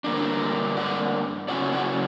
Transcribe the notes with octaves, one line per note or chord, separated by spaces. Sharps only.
G2 D3 A#3 D4
D5 F#5
C#3 F#3 C#4 E4 D5 F#5
D5 F#5